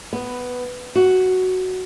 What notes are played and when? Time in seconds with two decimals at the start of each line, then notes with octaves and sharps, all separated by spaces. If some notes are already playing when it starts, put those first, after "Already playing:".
0.13 B3
0.96 F#4